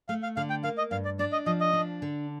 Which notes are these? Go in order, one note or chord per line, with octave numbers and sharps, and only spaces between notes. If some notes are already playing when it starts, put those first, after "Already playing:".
A3 F5
F5
D3 F5
G5
A#3 F5
D#5
G2 F5
D5
D4 D5
D#5
F3 D#5
D#5
D4
D3